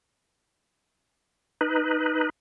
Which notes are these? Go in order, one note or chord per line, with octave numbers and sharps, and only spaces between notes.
D#4 B4